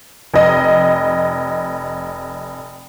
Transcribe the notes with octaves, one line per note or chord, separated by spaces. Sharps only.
F1 D#5